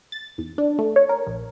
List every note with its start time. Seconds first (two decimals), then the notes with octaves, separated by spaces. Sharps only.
0.12 A6
0.38 E2
0.58 D4
0.79 A3
0.96 C#5
1.09 A#4
1.27 A#1